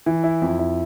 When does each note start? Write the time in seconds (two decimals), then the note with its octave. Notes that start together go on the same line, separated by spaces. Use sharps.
0.06 E3
0.24 E4
0.42 F2
0.59 E4